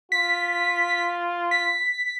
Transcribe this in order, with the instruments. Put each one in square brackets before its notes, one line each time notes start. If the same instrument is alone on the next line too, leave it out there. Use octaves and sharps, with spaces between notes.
[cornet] F4 [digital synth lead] B6
[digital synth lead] B6